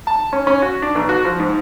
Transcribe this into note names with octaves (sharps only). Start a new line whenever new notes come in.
A5
C#4
C#4
F#4
D4
B1
F#4
F3
G#2